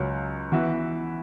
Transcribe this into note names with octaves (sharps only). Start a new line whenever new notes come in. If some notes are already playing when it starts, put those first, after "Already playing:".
Already playing: C#2 C#3 F#3 C#4
E3 B3 F#4 B4 E5